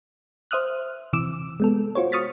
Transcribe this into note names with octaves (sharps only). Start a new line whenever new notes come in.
C5 E5 D#6 F6 F#6
C3 E3 D6 E6 E7
G#3 B3 A4
F4 F#4 C5 C#5
C#6 D#6 F6 A6 B6